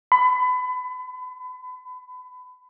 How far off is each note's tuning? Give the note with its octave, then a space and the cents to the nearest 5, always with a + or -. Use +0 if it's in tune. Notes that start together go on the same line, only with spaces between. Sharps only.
B5 +30